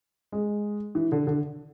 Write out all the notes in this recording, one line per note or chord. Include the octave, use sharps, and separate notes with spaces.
G#3
E3
D3
D3